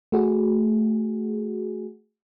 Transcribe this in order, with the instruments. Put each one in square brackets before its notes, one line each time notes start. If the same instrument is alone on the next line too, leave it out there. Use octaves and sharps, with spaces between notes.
[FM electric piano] A3 F#4 G#4